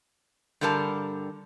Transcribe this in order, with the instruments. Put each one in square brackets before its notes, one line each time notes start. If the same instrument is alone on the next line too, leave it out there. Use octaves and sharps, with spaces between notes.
[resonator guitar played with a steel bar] G2 D3 G3 A#4 A5